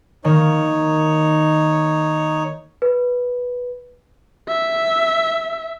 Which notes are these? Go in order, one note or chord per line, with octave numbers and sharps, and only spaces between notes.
D#3 A#3 D#4 C#5
B4
E5